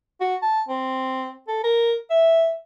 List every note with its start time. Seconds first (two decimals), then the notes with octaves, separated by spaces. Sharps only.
0.21 F#4
0.42 A5
0.69 C4
1.48 A4
1.64 A#4
2.11 E5